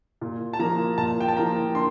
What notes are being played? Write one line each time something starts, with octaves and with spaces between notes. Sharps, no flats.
A#2
A5
F3 A#3 A#5
A#2 A5
G5
A5
F3 A#3 A#5
D3 C6